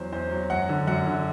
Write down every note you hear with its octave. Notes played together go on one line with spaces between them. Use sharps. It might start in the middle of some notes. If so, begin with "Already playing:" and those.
Already playing: E2 F#3 C5
E2 C5
F#3
F#2 F#5
D3
F#2 F#5
D3